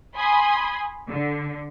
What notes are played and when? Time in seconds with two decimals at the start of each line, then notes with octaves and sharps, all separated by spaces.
0.16 G#5 B5 C6 D#6
1.08 D3